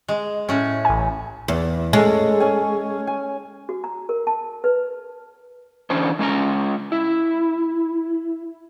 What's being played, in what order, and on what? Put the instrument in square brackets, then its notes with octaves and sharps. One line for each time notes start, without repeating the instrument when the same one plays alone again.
[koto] G#3
A2 C#4
[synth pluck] A1 G#5
[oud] E2
[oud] G#3 [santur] C#4 A4
[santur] C#4 G#5
G#5
[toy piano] F#4
A#5
A#4
A5
B4
[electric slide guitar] D3 E3 C#4 D4 C5
G#3 C#4 D4 A#5
E4